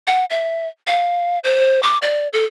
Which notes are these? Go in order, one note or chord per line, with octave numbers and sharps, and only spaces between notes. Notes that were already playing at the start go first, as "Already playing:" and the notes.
F#5
E5
F5
C5
D6
D5
A4